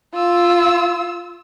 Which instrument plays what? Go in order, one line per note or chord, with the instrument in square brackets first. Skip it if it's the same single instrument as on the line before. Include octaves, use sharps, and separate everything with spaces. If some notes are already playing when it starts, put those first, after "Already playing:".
[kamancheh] F4 E6